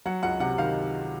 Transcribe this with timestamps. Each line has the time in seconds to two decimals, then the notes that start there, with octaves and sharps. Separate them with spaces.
0.05 F#3 F#5
0.23 C#2 F#5
0.40 C3 F#5
0.58 D#3 F5